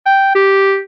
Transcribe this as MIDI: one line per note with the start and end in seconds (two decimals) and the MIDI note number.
0.06 0.32 79
0.35 0.80 67